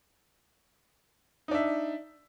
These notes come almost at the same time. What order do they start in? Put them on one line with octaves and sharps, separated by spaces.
D#4 D4 E5